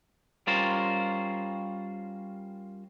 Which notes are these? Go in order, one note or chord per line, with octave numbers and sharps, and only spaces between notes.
G3 C#4 F4 A#4 C5